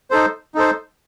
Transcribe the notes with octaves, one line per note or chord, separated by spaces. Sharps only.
D#4 A4 C5
D#4 A4 C5